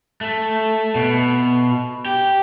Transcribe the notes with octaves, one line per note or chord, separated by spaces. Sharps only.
A3
B2
G4